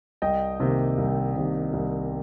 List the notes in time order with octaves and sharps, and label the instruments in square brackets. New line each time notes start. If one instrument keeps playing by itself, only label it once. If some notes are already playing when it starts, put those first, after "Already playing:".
[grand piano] C2 D#5 G5
C3 D#3 A#3
C2
C3 D#3 A#3
C2